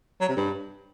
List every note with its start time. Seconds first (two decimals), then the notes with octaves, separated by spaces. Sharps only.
0.21 F#3
0.29 C3
0.37 G2